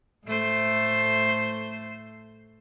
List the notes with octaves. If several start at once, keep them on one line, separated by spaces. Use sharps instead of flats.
A2 A3 C5